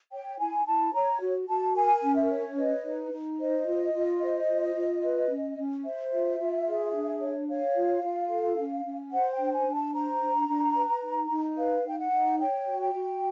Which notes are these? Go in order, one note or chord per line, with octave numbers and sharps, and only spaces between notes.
C#5 G5
E4 G#5
E4 A5
C#5 A#5
F#4
F#4 A5
A#4 G#5
C#4
E5
C#5
B4 D#5
D#4
D#4
C5 D#5
F4
F4
C5
F4
F4
B4
C#4
C#4
C5 E5
F4
F4
G#4
D4
C#5
C#5 F5
F4
F4
A4
C#4
C#4
C5 F#5
G5
D4
G#5
D4
A5
C5 A#5
D4
D4
B4
D#4
D#4
B4 F5
D#4 G5
F#5
D#4
C#5 G5
F#4
G5
F#4